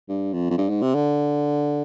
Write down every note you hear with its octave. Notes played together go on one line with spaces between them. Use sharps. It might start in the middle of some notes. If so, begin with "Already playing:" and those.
G2
F2
F2
G2
G#2
C3
D3